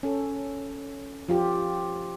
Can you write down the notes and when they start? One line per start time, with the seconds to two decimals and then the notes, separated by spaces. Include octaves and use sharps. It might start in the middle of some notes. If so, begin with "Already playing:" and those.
0.03 C#4 A4
1.28 F3 F4 G4